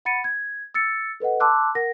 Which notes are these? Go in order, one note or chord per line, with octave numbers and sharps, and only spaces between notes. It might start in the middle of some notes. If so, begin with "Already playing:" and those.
F#5 B5 A6 C#7 D#7
G#6
E6 A6 C#7
A4 B4 D#5 F#5
A5 C6 D6 E6 F#6
A#4 F#5 A#6